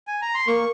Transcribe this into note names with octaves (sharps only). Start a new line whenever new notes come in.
G#5
A#5
C6
A#3 C#6